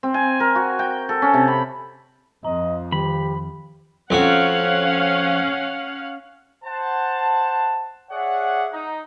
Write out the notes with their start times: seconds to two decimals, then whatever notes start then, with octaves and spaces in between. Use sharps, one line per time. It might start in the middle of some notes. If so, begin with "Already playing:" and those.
0.03 C4
0.14 G#5
0.40 A#4
0.55 F#4
0.79 G5
1.09 A4
1.22 C#4
1.34 C3
1.48 B5
2.44 F2 F3 D#5 A#5
2.92 D#3 G4 B5
4.10 F2 C#4 F#4 F5 F#5
6.64 C5 F#5 A5
8.11 G#4 C#5 D5 E5 F#5
8.73 D#4